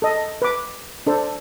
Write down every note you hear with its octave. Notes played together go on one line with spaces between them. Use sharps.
A4 D#5
B4 D6
D4 A4 C5